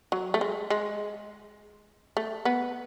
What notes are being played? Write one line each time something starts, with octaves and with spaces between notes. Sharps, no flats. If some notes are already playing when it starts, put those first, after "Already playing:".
F#3
A3
G#3
G#3
A3
B3